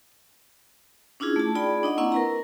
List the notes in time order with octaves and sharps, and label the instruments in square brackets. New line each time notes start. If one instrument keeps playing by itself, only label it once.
[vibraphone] C#4 D4 E4 F4 G#4
A3 A5
D#4 F4 G#4 D5 G5 B5
D4 D#4 D#5 F#5
A#3 C4 E4 F#5 C#6
A#4 B4 A#5